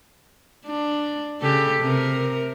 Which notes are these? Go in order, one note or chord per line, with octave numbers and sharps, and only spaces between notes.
D4
C#3 G4 A4
C3 A#4